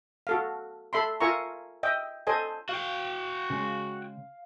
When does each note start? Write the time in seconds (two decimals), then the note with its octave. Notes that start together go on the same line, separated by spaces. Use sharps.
0.27 F#4 A4 F5
0.93 A4 E5 B5 C6
1.20 F4 A#4 E5 G#5 A#5 C#6
1.83 D#5 E5 G5
2.27 A4 C5 D#5 G#5
2.69 F#4 F5 G5
3.50 C#3 G#3